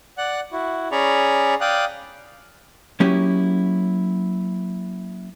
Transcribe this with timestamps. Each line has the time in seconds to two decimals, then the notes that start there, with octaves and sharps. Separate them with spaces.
0.18 D5 F#5 F#6
0.52 E4 F#4
0.92 C#4 G#4 D5 A#5 B5 C#6
1.61 D5 F5 G5 D#6 F#6
3.00 F#3 A#3 C#4 E4 G4 D#5